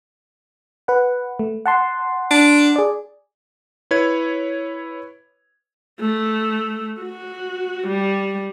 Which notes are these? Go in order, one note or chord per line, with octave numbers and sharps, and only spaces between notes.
B4 F#5
A3
F#5 A5 C6
D4
G#4 D5
E4 B4 C#5 G#6
A3
F#4
G3